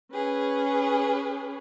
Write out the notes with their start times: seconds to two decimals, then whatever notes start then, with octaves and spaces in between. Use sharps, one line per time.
0.11 C#4 G#4 B4